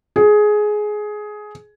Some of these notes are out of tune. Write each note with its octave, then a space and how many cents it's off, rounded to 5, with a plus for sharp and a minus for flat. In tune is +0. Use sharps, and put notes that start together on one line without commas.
G#4 +15